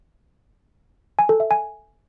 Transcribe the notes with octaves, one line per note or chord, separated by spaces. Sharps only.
G#5
A4
E5
G#5